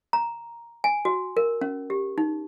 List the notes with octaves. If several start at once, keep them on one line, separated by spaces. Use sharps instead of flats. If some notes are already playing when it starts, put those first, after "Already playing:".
A#5
G#5
F#4
A#4
C#4
G4
D#4